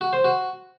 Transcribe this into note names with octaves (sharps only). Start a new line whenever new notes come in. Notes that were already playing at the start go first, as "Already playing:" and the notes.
F#4
C5
F#4